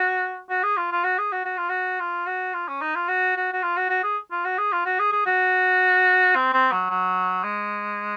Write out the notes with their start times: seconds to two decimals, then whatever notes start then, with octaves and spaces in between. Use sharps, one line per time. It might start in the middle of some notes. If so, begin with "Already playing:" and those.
Already playing: F#4
0.49 F#4
0.63 G#4
0.77 F4
0.91 F4
1.04 F#4
1.18 G#4
1.32 F#4
1.45 F#4
1.57 F4
1.69 F#4
2.00 F4
2.26 F#4
2.54 F4
2.68 C#4
2.81 D#4
2.95 F4
3.08 F#4
3.36 F#4
3.52 F#4
3.63 F4
3.76 F#4
3.89 F#4
4.03 G#4
4.31 F4
4.45 F#4
4.58 G#4
4.72 F4
4.85 F#4
4.99 G#4
5.12 G#4
5.26 F#4
6.35 C4
6.53 C4
6.71 F#3
6.90 F#3
7.44 G#3